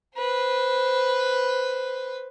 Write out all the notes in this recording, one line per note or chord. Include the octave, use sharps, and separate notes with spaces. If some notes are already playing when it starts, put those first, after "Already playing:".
B4 C5